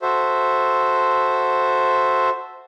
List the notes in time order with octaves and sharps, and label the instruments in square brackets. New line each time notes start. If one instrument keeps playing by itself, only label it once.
[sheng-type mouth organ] F#4 A4 C5 E5